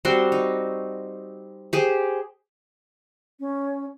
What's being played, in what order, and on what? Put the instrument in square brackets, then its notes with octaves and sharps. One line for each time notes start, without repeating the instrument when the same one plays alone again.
[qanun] G3 C4 F#4 C6
D#4
G4 G#4 C5
[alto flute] C#4